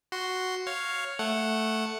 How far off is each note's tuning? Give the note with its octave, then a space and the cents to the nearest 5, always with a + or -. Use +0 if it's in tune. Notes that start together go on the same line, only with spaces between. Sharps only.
F#4 +0 C6 +0
C#5 +0 F5 +0
A3 +0 F#5 +0